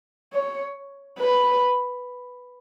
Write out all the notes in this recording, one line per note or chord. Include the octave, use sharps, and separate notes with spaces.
C#5
B4